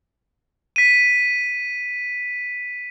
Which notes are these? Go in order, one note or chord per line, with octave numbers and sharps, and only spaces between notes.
B6 D#7